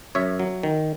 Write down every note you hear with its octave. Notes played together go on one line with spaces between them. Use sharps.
F#2 C#5 E5
F#3
D#3